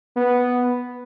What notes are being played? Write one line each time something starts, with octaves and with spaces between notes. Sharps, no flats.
B3